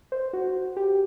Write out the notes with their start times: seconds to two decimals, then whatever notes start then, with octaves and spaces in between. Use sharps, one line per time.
0.12 C5
0.33 F#4
0.77 G4